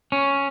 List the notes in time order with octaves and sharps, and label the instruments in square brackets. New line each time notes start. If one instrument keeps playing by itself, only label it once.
[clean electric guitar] C#4